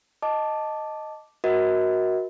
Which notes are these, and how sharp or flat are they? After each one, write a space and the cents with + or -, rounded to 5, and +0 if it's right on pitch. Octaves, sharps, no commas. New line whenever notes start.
D#5 +0 A5 +0 D6 +0
F#4 +0 A#4 +30 D#5 +45